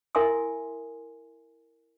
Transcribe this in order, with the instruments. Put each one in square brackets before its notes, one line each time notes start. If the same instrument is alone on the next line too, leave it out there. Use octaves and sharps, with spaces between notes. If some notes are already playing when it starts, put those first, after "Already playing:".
[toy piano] E4 A#4 E5 G#5 C6 D#6